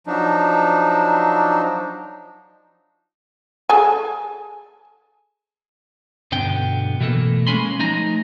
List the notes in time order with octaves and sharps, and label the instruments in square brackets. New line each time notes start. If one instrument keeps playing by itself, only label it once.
[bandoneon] F3 F#3 D4 D#4
[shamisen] G#4 A4 G#5
[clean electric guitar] B1 G2 D3 B3 G5
B2 E3 A3 A#3 A4
G#3 A#3 C#4 G#5 B5 C6
F3 A3 D#4 G#5 A#5